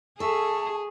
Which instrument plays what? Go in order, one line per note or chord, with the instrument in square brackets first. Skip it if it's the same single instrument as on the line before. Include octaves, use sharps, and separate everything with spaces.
[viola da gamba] G#4 [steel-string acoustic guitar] A4 E5 [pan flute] A5 [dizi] C#6